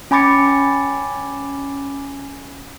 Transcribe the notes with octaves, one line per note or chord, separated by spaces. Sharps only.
C#4 G#5 B5 D6 A6 C#7